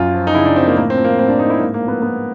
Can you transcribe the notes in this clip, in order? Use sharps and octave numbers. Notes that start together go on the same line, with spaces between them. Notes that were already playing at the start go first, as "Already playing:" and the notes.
Already playing: F#2 F4
F3
D#4
C#3 E4
D4
F3 C4
A#3
A2 A#3
C4
F3
A#3
A2 C4
D4
A2 D#4
E4
G#2 A#3
A#3
F3
B3
F3 B3